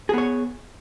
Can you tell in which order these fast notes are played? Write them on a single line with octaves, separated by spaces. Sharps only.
G#4 B3 C#5